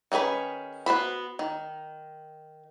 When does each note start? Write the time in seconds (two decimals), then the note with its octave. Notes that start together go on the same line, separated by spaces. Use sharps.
0.12 D#3 C#4 G#4 B4 B5
0.86 B3 F#4 C5 B5
1.39 D#3